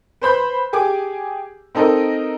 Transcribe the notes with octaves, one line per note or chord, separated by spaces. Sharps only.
B4 C5 B5 G6
G4 G#4 G#5 D6
C4 D#4 A4 A#4 D#5